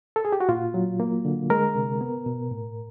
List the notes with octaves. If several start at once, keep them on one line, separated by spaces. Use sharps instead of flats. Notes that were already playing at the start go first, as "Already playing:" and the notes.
A4
G#4
G4
F#4
A#2 F4
F#3
A#3
D3
G#3 A#4
C3
B3
B2
A2